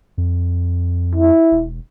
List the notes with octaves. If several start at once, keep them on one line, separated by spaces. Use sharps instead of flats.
F2
E4
E1